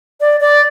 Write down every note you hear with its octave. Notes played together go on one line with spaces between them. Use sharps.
D5
D5